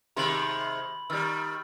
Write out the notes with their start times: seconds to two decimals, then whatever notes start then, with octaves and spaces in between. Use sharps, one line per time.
0.17 C3 D#3 G#3 B5 C6 F#7
1.10 D#3 G3 E6 F6 A6